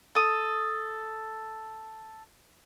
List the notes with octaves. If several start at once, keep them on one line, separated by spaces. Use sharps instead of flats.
A4 D#6